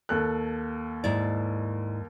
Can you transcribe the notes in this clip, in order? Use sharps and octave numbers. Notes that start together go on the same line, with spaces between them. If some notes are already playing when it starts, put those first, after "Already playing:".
D#2 A4 F#6
G#2 E4 D5